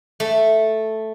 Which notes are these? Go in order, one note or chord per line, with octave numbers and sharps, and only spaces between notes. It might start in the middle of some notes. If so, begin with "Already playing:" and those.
A3